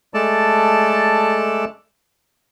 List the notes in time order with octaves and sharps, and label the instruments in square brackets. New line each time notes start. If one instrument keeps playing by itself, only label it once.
[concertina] G#3 A3 A4 D5 A5